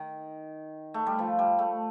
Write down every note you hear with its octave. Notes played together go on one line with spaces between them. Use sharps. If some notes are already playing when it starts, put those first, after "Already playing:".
Already playing: D#3
A3
G3
F3
G3
A3